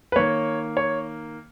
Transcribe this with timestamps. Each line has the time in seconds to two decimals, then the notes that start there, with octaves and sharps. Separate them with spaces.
0.12 B4
0.16 D#3 A#3 C#5
0.77 C#5